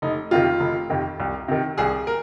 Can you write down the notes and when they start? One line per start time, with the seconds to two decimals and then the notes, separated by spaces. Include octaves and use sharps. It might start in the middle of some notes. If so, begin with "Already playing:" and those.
0.02 F1 D#4
0.31 F2 C3 D#3 F4
0.60 F1
0.90 F2 C3 D#3
1.20 C2
1.48 C3 D#3
1.78 C2 G#4
2.07 A#4